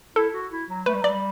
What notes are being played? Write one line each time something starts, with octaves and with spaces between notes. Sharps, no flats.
E4 A4
F#4
E4
F#3
A3 B4
G3
F#3
D5
G3